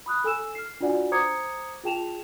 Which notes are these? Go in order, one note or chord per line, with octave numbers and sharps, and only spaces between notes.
B5 D#6 F#6
A4 G#5 E6 E7
F6 C7
D4 F4 F#4 D5 F#5 G#5
C5 A#5 D6 D#6 G#6 C#7
F4 G#4 G5 A5 E7 F7